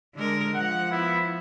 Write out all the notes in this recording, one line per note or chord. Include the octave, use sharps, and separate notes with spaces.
D3 G#3 A#4
F3 F#5
B3 E4